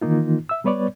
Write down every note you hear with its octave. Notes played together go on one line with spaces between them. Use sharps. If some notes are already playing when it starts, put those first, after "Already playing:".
D#3 E3 A#3 D#4 F4
E5 E6
G3 B3 B4 C#5 D5